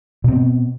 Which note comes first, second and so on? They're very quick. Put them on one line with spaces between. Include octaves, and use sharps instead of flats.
B2 C4 B3